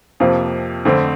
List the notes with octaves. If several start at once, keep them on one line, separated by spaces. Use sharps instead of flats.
F2 C3 F3 A#3
F2 D3 A3 C4